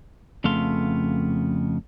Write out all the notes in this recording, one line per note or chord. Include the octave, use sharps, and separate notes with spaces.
F2 C#3 A3 B3 F5 C6